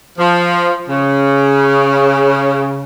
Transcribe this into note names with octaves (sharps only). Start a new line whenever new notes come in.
F3
C#3